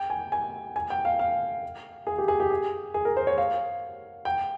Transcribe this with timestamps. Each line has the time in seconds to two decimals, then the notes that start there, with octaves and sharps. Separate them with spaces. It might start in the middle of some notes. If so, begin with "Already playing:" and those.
Already playing: G5
0.10 G#5
0.32 G#5
0.76 G#5
0.90 G5
1.05 F5
1.19 F5
2.07 G#4
2.18 G4
2.28 G#4
2.40 G4
2.50 G#4
2.94 G#4
3.05 A#4
3.17 C5
3.27 C#5
3.38 F5
4.25 G5